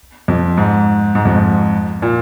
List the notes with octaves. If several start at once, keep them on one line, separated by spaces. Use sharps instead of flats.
F2
G#2
G#2
F2
G#2
A#2